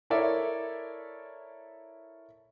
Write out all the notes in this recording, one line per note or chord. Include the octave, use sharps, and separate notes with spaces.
E4 A4 A#4 C#5 D5 E5